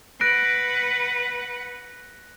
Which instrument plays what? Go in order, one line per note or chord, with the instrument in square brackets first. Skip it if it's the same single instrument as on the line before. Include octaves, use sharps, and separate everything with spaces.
[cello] B4 F#5 [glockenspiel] F#6 A#6 D7